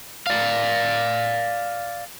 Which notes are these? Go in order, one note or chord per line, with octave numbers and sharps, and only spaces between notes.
D5 F5